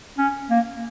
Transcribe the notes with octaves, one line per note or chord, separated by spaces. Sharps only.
C#4
A#3